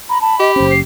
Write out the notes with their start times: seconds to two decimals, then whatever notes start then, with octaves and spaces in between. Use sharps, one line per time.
0.09 A#5 B5
0.21 A5 B5
0.40 G4 D#5
0.56 F#1 C#4 C5
0.71 C7